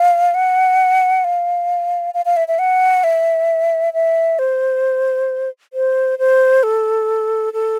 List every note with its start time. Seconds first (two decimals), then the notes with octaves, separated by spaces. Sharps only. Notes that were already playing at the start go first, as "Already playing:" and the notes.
Already playing: F5
0.34 F#5
1.24 F5
2.14 F5
2.25 F5
2.37 E5
2.48 E5
2.59 F#5
3.04 E5
3.94 E5
4.39 C5
5.73 C5
6.19 C5
6.63 A4
7.53 A4